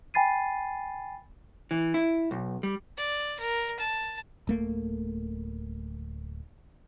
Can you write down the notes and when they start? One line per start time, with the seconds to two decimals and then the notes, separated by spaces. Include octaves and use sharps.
0.14 G5 G#5 B5 A6 C7 D#7
1.71 E3
1.94 E4
2.31 B1
2.63 G3
2.97 D5
3.40 A#4
3.80 A5
4.47 D1 A3 A#3